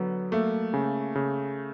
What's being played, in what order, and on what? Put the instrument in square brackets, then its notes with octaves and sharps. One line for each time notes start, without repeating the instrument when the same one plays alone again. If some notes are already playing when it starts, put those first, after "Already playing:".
Already playing: [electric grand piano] D3 F#3 [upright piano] B3
[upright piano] A3 [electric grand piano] A#3
[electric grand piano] C#3
C#3